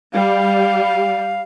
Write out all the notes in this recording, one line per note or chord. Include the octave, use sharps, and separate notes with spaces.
G3 F5